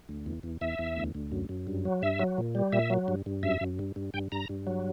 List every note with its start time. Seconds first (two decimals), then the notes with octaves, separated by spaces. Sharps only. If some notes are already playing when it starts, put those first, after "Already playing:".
0.09 D2
0.26 E2
0.43 E2
0.61 E2 E5
0.79 E2
0.97 D2
1.15 D2
1.32 F#2
1.49 F#2
1.67 G2
1.85 F#3
2.02 G2 E5
2.19 F#3
2.38 A#2
2.55 G3
2.73 A#2 E5
2.90 F#3
3.08 G2
3.26 G2
3.43 F#2 E5
3.61 F#2
3.79 G2
3.96 G2
4.14 G2 G5
4.32 G2 A#5
4.49 G2
4.67 F#3